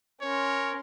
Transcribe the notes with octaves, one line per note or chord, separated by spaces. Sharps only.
C#4 A#4 C#5 C6